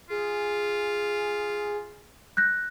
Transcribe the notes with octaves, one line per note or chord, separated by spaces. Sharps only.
F4 G#4
F#6 G6 A#6